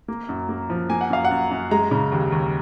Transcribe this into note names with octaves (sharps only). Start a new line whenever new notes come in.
A#3
F#2
A#3
F3
A#3 G#5
F#5
F#2 F5
F#5
F#2
F#2
G#3 A#5
C#3
D#2
D#2